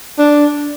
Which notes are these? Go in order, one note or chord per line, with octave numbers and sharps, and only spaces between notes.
D4